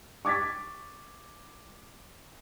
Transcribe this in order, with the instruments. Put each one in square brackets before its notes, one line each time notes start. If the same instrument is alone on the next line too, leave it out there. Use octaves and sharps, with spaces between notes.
[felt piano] C#6 D6 G#6 A6 B6